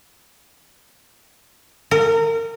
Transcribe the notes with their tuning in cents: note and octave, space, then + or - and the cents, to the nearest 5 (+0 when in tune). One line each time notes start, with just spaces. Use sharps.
A#4 -30